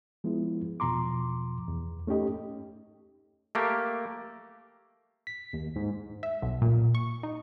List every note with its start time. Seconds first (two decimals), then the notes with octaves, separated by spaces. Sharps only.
0.24 F3 G#3 B3 E4
0.80 E2 B2 F3 A#5 C6 D6
1.68 E2
2.07 A3 C#4 D#4 G4 D#5
3.55 A3 A#3 G4
5.27 B6
5.53 D#2
5.76 G#2
6.23 E5
6.42 B1
6.62 A#2
6.95 C#6
7.23 D#4